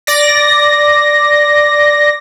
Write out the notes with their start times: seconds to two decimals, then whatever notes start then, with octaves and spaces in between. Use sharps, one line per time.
0.07 D5 A#6